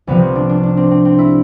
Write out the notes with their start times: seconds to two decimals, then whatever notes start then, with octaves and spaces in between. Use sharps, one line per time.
0.07 C2 C3 F3 B3
0.22 C4
0.35 D4
0.49 D4
0.63 D4
0.77 C4
0.91 C4
1.05 C4
1.19 E4